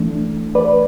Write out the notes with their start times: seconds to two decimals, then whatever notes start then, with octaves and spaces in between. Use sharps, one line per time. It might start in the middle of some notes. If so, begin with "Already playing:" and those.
Already playing: E3 A3 D4
0.55 B4 D5